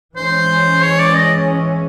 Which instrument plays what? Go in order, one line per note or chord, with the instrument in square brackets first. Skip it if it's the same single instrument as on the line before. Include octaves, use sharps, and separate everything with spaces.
[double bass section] E3 G#3 C#4 [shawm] C5
[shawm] C#5
D5
D#5